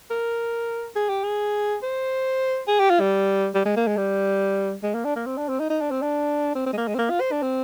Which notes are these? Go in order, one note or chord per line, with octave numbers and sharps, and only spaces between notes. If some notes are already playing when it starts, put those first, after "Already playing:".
A#4
G#4
G4
G#4
C5
G#4
G4
F4
G3
G3
G#3
A#3
G#3
G3
G#3
A#3
D4
A#3
C4
D4
C4
D#4
D#4
D4
C4
D4
C4
C4
G#3
A#3
G#3
C4
A#3
F4
C5
D4
C4